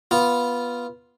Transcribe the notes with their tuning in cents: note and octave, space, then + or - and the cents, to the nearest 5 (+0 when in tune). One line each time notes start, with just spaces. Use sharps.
B3 -15 F4 -5